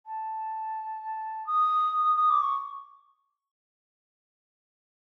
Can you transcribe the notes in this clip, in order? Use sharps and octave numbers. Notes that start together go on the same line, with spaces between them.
A5
D#6
D#6
D6
C#6